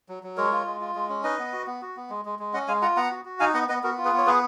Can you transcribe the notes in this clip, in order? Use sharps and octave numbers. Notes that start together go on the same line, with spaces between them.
F#3
F#3
G#3 A#4 C#5
F4
G#3
F4
G#3
C#4
D#4 B4 D#5
B3
F#4
B3
F#4
B3
G#3
G#3
G#3
C#4 D#5 F#5
G#3 F5 G#5
F4 F#5 A#5
B3 F#5 A#5
F#4
F#4
D#4 F5 G#5
B3 D#5 F#5
B3 B4 D#5
B3 F#4 A#4
F4
G#4 B4
B3
C#5
B3 G#4 B4